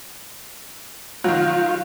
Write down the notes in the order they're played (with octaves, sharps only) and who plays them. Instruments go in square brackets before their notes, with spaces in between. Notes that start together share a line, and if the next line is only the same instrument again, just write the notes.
[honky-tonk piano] D#3 F#3 [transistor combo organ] F4